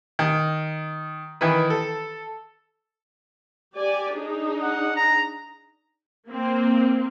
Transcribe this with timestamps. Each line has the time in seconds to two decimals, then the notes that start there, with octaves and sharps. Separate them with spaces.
0.19 D#3
1.41 D#3 E3 E4 B4
1.70 A4
3.76 G4 D5 G#5
4.15 D4 D#4 G#4
4.63 F#5
4.96 A#5
6.27 A#3 C4